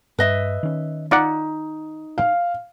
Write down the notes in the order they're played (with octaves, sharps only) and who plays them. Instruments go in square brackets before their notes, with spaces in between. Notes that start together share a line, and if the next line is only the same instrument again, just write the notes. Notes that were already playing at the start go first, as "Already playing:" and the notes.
[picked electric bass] G2 [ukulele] B4 D#5 E5
[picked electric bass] D#3 C#4
[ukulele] D#4 [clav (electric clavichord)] F4 D5 F#5
[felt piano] F5